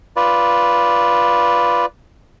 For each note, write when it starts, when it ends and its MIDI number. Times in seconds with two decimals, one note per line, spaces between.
0.16 1.86 65
0.16 1.86 71
0.16 1.86 74